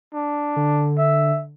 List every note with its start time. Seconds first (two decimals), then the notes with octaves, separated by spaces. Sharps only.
0.14 D4
0.56 D3
0.98 E5